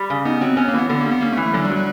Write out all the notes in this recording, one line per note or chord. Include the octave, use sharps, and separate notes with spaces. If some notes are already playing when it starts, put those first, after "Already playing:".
Already playing: G3
C#3
B3 D#4
F#3 C4
B3 C#4
A#3
E3 B3
D3 B3
G3 A#3
B3
A#3 C#4
A3
E3
A3
D3 F#3
G3
F#3
G3